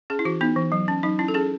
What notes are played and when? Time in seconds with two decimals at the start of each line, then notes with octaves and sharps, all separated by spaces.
0.10 C#4 G#4
0.19 E4
0.25 E3 F#4
0.41 B3 D#4
0.56 E3
0.72 F#3
0.88 C#4
1.03 F#3 D#4
1.19 C#4 E4
1.28 A4
1.34 C#4 G#4